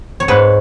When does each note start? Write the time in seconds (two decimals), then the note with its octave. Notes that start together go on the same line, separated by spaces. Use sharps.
0.20 C#5
0.28 G#2 B4